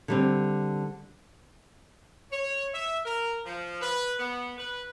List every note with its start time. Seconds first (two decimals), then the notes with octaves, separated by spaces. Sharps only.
0.08 D3 G3 C4
2.31 C#5
2.73 E5
3.05 A#4
3.45 F3
3.81 B4
4.19 B3
4.57 B4